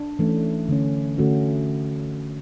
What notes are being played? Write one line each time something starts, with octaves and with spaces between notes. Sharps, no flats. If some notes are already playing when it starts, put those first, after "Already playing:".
Already playing: D4
E3 A3 C#4
D3 A3 C#4
D3 A3 C#4 F#4